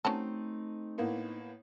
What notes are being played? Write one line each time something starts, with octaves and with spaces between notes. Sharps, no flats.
F#3 A3 C4 C#4 D#4 A4
A2 A#3 B3